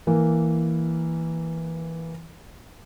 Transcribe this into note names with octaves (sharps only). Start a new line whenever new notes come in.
E3 A#3